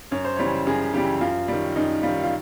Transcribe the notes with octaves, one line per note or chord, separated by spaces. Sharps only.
F#2 C#5
C5
C#3 E3 G3 C#5
F#2 G#4
C#3 E3 G3 G4
F#2 F4
D#3 G3
F#2 D#4
G3 F4
D#3
F4